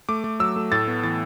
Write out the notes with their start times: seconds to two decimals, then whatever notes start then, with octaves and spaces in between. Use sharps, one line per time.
0.09 A3 D6
0.24 A3
0.40 F#3 E6
0.56 A3
0.72 A2 A6
0.88 B3
1.03 E3 A6